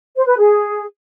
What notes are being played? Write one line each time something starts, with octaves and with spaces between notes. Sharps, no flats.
C5
B4
G#4